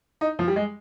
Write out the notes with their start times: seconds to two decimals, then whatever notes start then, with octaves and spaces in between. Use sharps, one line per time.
0.21 D#4
0.39 F3
0.48 G3
0.56 G#3